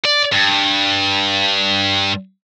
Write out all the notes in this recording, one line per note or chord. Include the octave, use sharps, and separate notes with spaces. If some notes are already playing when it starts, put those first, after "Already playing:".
D5
G2